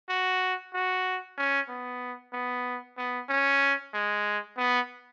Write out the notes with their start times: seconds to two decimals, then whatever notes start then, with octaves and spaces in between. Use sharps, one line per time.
0.09 F#4
0.74 F#4
1.38 C#4
1.69 B3
2.33 B3
2.97 B3
3.29 C#4
3.94 G#3
4.58 B3